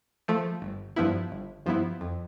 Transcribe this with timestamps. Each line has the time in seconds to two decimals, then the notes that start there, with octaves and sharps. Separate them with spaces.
0.28 F3 A3
0.62 G1
0.96 G2 F3 B3 E4
1.32 G1
1.66 G2 F3 B3 E4
2.01 F2